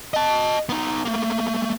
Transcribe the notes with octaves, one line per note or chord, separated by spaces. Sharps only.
D#5 A5
B3 D#4
A3 A#3